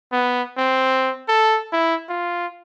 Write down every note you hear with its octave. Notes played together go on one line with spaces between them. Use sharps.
B3
C4
A4
E4
F4